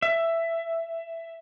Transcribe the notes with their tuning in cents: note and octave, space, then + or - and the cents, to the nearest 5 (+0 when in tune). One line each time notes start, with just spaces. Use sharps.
E5 +10